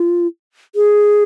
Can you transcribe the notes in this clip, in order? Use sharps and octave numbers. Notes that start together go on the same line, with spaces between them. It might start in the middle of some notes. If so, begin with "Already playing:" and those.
Already playing: F4
G#4